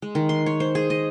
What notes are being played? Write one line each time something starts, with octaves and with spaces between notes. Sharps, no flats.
G#3
D#3
C6
C#5
C5
G#4
D#5